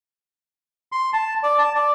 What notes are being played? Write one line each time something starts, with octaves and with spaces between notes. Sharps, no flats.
C6
A5
D5
A5
D5